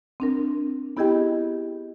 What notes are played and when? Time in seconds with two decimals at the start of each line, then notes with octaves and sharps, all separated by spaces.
0.20 C4 D4 A#4
0.97 B3 E4 G4 G#4 D#5 G5